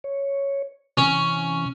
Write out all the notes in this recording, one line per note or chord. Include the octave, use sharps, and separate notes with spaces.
C#5
C3 E3 C#4